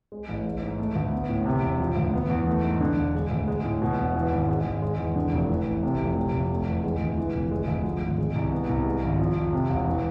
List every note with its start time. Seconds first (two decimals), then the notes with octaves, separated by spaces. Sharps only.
0.12 G#3
0.29 A1
0.46 G#3
0.62 G#2
0.79 A3
0.96 D2
1.12 B3
1.29 A2
1.46 C3
1.63 E1
1.80 F3
1.97 D2
2.13 B3
2.30 E2
2.47 A3
2.63 G#2
2.80 D3
2.97 E1
3.15 G#3
3.31 D2
3.48 G#3
3.65 A2
3.82 B2
3.98 E1
4.15 E3
4.32 G#1
4.48 G#3
4.65 G#1
4.82 G#3
4.99 E2
5.16 D3
5.32 F1
5.49 E3
5.66 A1
5.83 C3
6.00 F1
6.17 C3
6.33 F1
6.50 A3
6.67 E2
6.84 G#3
7.01 D2
7.17 E3
7.34 F1
7.51 G#3
7.68 D2
7.85 F3
8.01 G#1
8.18 G#3
8.35 C2
8.52 B3
8.69 C2
8.86 G#3
9.03 G#1
9.19 F3
9.36 F2
9.53 C3
9.70 E1
9.87 E3